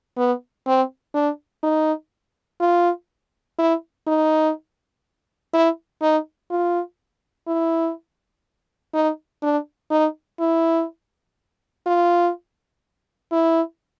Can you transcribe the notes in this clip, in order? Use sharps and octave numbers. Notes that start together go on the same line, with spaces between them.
B3
C4
D4
D#4
F4
E4
D#4
E4
D#4
F4
E4
D#4
D4
D#4
E4
F4
E4